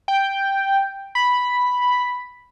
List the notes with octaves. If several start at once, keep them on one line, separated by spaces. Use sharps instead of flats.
G5
B5